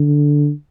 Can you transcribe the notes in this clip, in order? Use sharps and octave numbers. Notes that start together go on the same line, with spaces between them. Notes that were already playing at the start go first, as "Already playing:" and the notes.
Already playing: D3